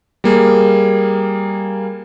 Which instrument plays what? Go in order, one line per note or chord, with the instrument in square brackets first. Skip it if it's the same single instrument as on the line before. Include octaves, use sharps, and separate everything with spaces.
[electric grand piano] G3 A#3 G#4